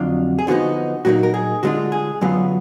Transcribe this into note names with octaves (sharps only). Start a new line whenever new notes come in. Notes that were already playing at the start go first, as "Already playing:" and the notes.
Already playing: F2 D3 F#3 D4 F4 F5
G#4
D3 F3 G#3 B3 D#4 F#4
A#2 F#3 A#3 D#4 F#4
A#4
G#4
D3 G#3 D4 F4 F#4
G#4
F#2 D3 F#3 B3 F4 F5